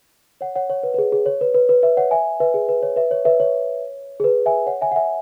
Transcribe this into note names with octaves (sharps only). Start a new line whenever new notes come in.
C#5 F#5
C#5 F#5
C#5
B4
B4
G#4
G#4
C#5
B4
B4
B4
B4 E5
C#5 F#5
E5 G#5
B4 E5
G#4
B4
C#5
B4 E5
C#5
B4 E5
C#5
G#4
B4
E5 G#5
C#5 F#5
E5 G#5
F#5
E5 G#5